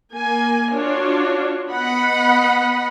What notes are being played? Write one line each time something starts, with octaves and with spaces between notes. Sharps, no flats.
A#3 G#5
D4 F4 F#4 C#5
B3 D#5 F#5 B5